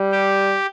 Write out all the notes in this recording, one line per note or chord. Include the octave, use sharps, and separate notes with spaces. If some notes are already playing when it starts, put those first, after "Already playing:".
Already playing: G3
G4